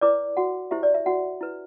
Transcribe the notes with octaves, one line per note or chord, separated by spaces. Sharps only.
E4 B4 D5 D6
F#4 F#5
E4 G4 C5 E5
D5
E5
F#4 F#5
E4 B4